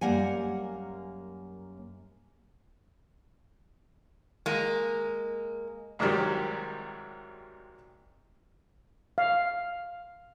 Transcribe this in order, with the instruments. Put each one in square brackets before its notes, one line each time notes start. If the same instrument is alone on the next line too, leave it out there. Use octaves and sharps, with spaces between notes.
[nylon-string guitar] F#2 G3 A#3 F#5 G#5
[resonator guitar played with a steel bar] G#3 A#3
[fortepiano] C2 G#2 C3 D#3 F#3 G3
[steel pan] F5